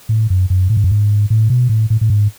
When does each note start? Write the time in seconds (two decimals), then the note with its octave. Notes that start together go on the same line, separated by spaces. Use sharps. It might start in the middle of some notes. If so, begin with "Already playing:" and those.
0.09 A2
0.30 F#2
0.50 F#2
0.69 A2
0.77 G#2
0.84 F#2
0.91 G#2
1.30 A2
1.50 B2
1.69 A2
1.90 A2
2.01 A2
2.10 G#2